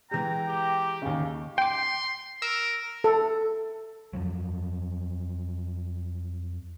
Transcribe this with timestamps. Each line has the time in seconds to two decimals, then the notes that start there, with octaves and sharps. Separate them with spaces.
0.11 E3 G#3 G5 A#5
0.48 G4
1.02 D#2 C#3
1.58 G5 C6 D6
2.42 A#4 E6
3.04 A4
4.13 F2 F3 F#3